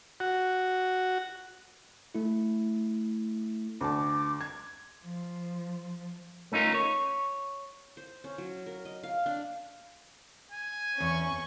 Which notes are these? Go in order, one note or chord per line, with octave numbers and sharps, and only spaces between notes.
F#4
A3 E4
D2 A5 D6
G#6
F3
A3 C#4 D#4 F4 A#4
C#5
C5
C#4
F#3
A#4
D#5
F5
D4
G#5
E2 C#4 C#6